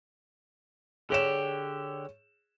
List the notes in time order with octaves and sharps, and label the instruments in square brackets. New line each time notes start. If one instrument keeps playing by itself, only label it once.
[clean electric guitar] D3 G4 [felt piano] G#4 C#5 E7